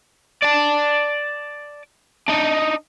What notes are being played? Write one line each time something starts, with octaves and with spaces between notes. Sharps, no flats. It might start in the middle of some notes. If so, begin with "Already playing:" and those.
D5 A5
D4 D#4